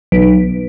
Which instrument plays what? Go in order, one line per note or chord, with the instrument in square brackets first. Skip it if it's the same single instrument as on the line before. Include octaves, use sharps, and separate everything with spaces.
[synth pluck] B1